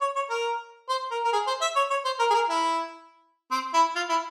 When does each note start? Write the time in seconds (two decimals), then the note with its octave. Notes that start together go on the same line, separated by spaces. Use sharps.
0.01 C#5
0.16 C#5
0.30 A#4
0.89 C5
1.11 A#4
1.24 A#4
1.33 G#4
1.47 C5
1.62 E5
1.76 C#5
1.90 C#5
2.05 C5
2.19 A#4
2.30 G#4
2.34 A#4
2.50 E4
3.51 C4
3.74 E4
3.96 F4
4.09 E4